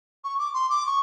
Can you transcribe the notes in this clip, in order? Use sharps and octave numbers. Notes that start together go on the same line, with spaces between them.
C#6
D6
C6
D6
C#6